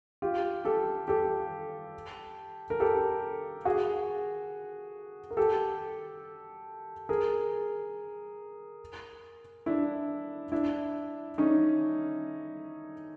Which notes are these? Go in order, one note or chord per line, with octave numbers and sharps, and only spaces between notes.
F4 G4
G4 A4
G4 A4
A#4
G4 A4
F#4 G#4
A#4
G4 A4
G#4 A#4
D4 E4
D4 E4
C#4 D#4